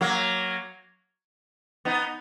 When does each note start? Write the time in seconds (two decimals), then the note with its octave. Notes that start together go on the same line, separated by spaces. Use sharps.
0.01 F#3 A#3
1.85 B3 D#4